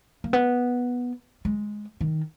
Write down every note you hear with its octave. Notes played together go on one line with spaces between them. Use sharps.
A#3
B3
G#3
D#3